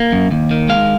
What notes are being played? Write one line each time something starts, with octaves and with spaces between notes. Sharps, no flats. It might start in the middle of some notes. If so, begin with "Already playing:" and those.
Already playing: A#3
F#2
D#2
D#3
G#3 F5